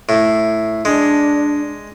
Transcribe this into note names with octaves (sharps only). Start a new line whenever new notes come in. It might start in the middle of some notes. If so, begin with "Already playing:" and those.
A2
G#3 D4